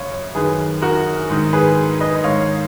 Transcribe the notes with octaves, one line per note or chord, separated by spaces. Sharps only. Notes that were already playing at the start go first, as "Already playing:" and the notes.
Already playing: F#2 C#3 C#5 F5
F#2 D#3 G#4 B4
F#4 A#4
G#2 D#3
G#4 B4
B4 D#5
G#2 D#3 C#5 F5